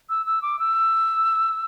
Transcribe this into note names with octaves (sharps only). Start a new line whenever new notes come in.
E6
E6
D6
E6